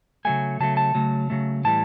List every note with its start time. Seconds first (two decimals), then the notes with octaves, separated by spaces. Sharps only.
0.25 C#3 F#3 A3 G#5
0.60 C#3 F#3 A3 A5
0.77 A5
0.95 C#3 F#3 A3
1.30 C#3 F#3 A3
1.64 A2 E3 G3 A5